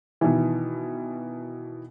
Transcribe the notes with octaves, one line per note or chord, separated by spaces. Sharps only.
B2 D#3 E3